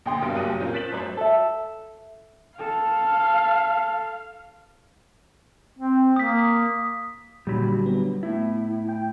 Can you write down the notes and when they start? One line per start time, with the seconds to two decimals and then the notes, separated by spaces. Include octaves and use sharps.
0.06 A#1 D3 G5 C6 D#6
0.22 B1 G2 A#3 D7
0.35 F#1 F#3 G4 D#7
0.60 A#2 C4 C#4 F4 A#4 G6
0.73 F#6 A6 B6 D7 E7 F#7
0.91 A1 F#2 C5
1.17 A4 E5
2.59 A4 F5
5.79 C4
6.16 A#3 D#6 B6
7.47 A#2 D3 F#3 G3 B5
7.86 B3
8.23 A2 E4
8.89 G5